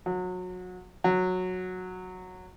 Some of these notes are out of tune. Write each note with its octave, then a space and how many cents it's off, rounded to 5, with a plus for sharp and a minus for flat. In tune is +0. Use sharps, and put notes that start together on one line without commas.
F#3 -25
F#3 -10